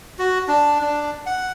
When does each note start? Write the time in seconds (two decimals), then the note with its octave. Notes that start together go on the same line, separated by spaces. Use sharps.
0.19 F#4
0.48 D4
0.82 D4
1.26 F#5